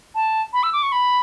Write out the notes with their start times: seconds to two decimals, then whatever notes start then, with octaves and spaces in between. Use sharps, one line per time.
0.15 A5
0.53 B5
0.63 E6
0.73 D6
0.83 C#6
0.92 B5